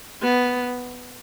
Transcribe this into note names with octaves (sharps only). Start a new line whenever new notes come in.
B3